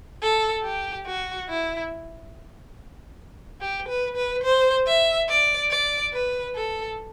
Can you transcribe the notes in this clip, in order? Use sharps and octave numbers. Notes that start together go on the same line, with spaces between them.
A4
G4
F#4
E4
G4
B4
B4
C5
E5
D5
D5
B4
A4